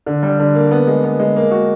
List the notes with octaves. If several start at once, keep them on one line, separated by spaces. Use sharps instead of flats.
D3
G3
D3
A#3
B3
G#3
B3
G#3
A#3
F#4